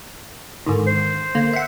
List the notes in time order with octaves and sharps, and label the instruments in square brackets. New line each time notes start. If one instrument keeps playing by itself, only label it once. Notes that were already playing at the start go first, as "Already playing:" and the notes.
[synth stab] G#2 D3 D#3
[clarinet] C5
[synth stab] D3 A#3
E5 F#5